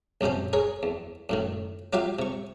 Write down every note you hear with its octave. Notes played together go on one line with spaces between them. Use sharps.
A#1 F#2 C3 C#4 C5
G#4 A#4 C#5
E2
F#2 A2 D#3
F#3 F4 G4 E5 F5
C3 C#6